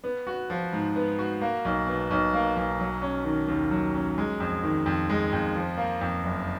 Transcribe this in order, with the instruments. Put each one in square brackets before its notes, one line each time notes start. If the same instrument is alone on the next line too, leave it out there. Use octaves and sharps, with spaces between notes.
[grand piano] B3
F#4
F3
G#2
B3
F#4
A#3
B1
B2
B1
A#3
B1
F#3
C#4
D#3
D#2
F#3
C#4
G#3
F2
D#3
F2
G#3
F2
F3
A#3
F2
F#1